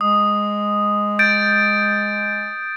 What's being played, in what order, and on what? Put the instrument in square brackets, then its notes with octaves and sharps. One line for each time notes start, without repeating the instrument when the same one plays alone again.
[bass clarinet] G#3 [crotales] D#6
[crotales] G6 A6 D7